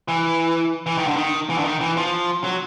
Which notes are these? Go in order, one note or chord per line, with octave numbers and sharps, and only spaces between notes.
E3
E3
D#3
D3
D#3
E3
D3
D#3
E3
F3
F#3